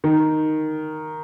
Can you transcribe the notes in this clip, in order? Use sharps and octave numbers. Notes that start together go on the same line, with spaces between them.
D#3